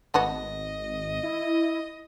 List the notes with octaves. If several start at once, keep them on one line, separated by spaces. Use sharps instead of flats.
G#1 A3 B3 F#4 D#5
E4